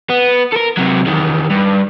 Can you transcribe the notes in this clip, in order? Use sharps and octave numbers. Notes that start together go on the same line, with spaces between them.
B3
A4 A#4
C3 F#3
E2 D#3
G2